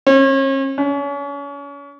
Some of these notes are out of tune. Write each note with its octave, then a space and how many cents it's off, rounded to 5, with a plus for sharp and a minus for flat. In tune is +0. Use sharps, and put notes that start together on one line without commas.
C#4 -40
C#4 +35